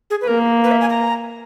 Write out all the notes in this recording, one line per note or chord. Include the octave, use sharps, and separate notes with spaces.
G#4
B4
A#3 A#4
B4
E5
G#5
A#5